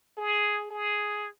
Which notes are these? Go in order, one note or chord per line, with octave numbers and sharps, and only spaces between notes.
G#4
G#4